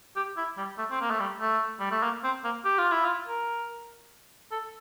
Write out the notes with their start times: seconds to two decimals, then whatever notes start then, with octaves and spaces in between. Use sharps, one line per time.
0.16 G4
0.37 E4
0.57 G3
0.78 A3
0.91 C4
1.01 A#3
1.10 A3
1.20 G3
1.41 A3
1.80 G3
1.91 A3
2.03 A#3
2.24 C4
2.44 A#3
2.65 G4
2.78 F4
2.92 E4
3.05 F4
3.27 A#4
4.52 A4